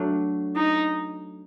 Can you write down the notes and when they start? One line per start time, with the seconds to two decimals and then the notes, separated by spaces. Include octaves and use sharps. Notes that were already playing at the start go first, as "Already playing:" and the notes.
Already playing: F#3 A3 D4
0.55 D#4